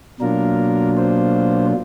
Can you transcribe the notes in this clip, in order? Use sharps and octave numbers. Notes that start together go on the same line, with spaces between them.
B2 F#3 A#3 D4 F4 A#4
C5